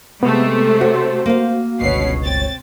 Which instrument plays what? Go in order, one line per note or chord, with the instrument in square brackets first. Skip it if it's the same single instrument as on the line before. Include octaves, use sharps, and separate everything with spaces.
[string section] C3 A3 [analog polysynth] G#3 [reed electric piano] B3
[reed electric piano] F#4 [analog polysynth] C5 [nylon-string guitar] C#5
[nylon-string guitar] A#3 F5
[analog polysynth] G1 C#2 C#5 [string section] B2 C7
[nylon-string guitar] C4 [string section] A6